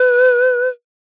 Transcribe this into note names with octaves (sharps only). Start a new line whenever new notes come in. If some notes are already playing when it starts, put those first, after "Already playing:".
Already playing: B4